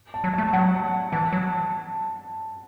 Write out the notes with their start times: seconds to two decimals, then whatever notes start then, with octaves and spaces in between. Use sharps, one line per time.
0.14 A5
0.24 F#3
0.34 A5
0.38 A3
0.49 A5
0.53 F#3 F#5
1.12 E3 A5
1.33 F#3